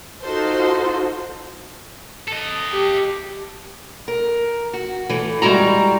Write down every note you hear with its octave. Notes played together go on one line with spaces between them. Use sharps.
D#4 F4 F#4 A4 C5
A4 D#5
G4
A#4
F#4
E3 A3
G3 G#3 E4 F#4 A#5